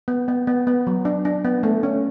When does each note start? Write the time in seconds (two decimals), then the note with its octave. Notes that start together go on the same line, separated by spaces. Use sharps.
0.08 B3
0.28 B3
0.47 B3
0.67 B3
0.87 F#3
1.05 D4
1.25 D4
1.45 B3
1.63 A3
1.83 C#4